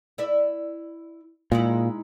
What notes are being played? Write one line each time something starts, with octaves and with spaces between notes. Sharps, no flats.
E4 D5 E5
A#2 G#3 D#4 E4